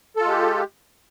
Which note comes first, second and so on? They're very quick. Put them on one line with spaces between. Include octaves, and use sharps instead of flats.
A4 F4 G#3 G4